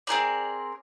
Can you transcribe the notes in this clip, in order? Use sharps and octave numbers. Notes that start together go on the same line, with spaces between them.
C4 G#4 A#4 D5